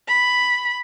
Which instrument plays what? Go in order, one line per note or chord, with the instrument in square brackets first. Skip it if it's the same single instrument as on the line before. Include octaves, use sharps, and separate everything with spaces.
[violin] B5